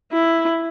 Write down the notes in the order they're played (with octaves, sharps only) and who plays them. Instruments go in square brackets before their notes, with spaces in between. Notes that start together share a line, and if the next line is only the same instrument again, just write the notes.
[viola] E4